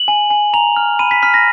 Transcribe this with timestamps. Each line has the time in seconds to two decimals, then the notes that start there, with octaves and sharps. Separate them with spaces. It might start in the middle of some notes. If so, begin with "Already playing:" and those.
Already playing: F#7
0.08 G#5
0.30 G#5
0.54 A#5 F7
0.76 F6
0.99 B5 D#7
1.11 B6
1.22 F6 B6
1.34 A#6